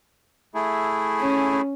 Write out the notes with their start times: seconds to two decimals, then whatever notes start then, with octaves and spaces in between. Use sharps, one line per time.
0.55 A3 E4 G#4
1.19 C#4